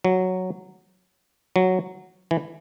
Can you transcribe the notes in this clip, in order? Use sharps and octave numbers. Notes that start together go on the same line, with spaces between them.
F#3
F#3
E3